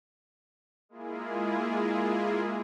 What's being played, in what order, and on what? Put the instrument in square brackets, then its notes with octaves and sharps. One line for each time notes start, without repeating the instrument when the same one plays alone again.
[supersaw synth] G#3 A#3 E4 F4 G#4